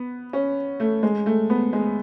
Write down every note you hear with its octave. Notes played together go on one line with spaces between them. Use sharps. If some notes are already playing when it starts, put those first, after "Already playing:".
Already playing: B3
C#4
A3
G#3
A3
B3
G#3